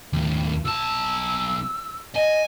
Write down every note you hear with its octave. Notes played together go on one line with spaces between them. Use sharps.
D#2 A2
B1 A5 E6
D#5 G#5